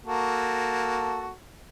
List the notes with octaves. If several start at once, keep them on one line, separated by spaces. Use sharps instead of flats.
A#3 F#4 A4